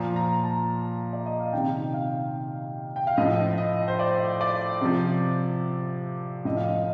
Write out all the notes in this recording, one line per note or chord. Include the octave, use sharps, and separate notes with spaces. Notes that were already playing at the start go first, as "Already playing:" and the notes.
Already playing: A#2 F3 A#5
A#5
A5
D5
D#5
F5
C3 D#3 G5
F5
G5
F5
A2 F3 D#5
D#5
C5
D5
D5
C3 F3
A2 F3 D#5
F5
D#5